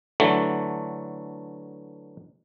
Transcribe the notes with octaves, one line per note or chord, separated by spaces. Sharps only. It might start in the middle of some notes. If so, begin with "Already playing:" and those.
D3 E3 F#3 A3